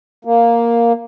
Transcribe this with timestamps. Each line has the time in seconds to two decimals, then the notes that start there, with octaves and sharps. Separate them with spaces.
0.25 A#3